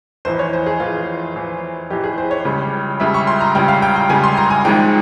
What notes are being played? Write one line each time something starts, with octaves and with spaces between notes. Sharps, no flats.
F1 E2 E3 C5
C#5
C5
G#4
F1 E2 E3 F4
F1 E2 E3
F1 E2 E3 G4
G#4
C5
C#5
C#2 C#3 G3
C#2 C#3 G3 E5
C#6
C6
A#5
C#2 C#3 G3 G5
F5
G5
G5
C#2 C#3 G3 G#5
C6
A#5
G#5
G#1 G#2 F3 G#3 G5